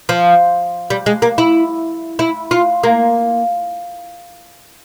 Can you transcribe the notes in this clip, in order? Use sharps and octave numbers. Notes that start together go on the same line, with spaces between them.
F3
G3
G#3
A#3
E4
E4
F4
A#3